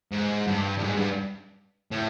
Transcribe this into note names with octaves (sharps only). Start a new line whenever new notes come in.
G#2
G2
G2
G#2
G2
A2